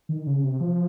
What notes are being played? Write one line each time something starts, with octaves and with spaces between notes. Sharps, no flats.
D#3
C#3
C3
F3